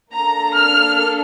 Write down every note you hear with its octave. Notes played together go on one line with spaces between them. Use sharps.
A#3 D4 A4 A#5
F6